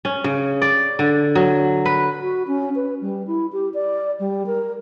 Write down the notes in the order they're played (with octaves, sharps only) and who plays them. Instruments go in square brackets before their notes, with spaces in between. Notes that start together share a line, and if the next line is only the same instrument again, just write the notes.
[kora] C#4
C#3
D5
D3
F#3
B4
[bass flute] F#4
C#4
B4
G3
E4
G4
D5
G3
A#4